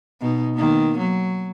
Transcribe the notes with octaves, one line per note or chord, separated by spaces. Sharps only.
B2 D#4
D#3 A#3 B3
F#3